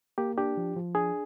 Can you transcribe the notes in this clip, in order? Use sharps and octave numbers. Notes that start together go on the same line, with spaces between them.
A#3 G4
D4 G4
F3
F3
D4 G#4